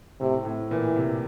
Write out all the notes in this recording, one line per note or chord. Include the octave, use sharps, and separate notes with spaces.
A2 C3
A2
A#2 E3
C3